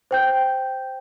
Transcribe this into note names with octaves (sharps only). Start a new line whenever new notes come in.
C5 G5 G6